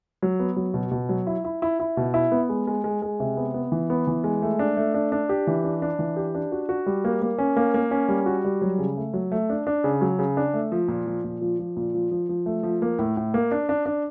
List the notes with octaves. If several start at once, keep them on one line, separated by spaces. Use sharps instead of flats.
F#3
B3
F#3
B2
B2
F#3
E4
E4
E4
E4
B2
E4
B3
G#3
G#3
G#3
G#3
C3
B3
B3
E3
B3
E3
G#3
A3
D4
A3
D4
D4
G4
E3
D4
D4
E3
G4
D4
F#4
F#4
G3
A#3
A#3
C#4
A#3
A#3
C#4
G3
F#4
G3
F#3
C#3
A3
F#3
A3
D4
D4
C#3
F#3
C#3
D4
A3
F3
A#2
F3
A#2
F3
F3
A#2
F3
F3
F3
A3
F3
A#3
A2
A2
A#3
D4
D4
D4